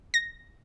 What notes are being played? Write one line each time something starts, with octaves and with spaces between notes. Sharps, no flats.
A#6